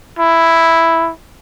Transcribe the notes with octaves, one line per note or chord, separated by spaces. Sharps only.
E4